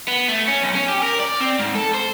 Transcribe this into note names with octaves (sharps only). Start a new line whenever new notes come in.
B3
A3
C#4
B1
C#4
G4
A#4
D5
C4
G#2
A4
C5